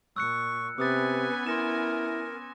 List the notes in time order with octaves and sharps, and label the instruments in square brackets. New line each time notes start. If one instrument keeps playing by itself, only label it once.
[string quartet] A#2 [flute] C#6 [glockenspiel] E6 F#6 C#7
[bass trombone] C3 [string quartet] B3 C#4 G#5 [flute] B4 [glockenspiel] D6 D#6 A6
[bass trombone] E4 [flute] A#4 [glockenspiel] C6 A#6 E7